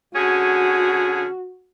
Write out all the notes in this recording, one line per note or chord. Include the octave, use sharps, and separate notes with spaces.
D3 C#4 F#4 G#4